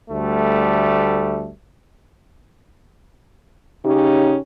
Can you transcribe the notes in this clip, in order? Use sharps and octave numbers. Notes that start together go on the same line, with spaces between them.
D2 G3 A3
C#3 C#4 D#4 G4